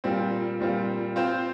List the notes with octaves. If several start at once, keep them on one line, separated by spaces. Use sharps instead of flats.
A#2 G3 C4 F4
A#2 G3 C4 F4
C4 F4 C5